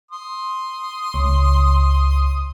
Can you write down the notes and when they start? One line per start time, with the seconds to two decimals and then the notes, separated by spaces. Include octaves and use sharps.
0.11 C6 D#6
1.14 C#2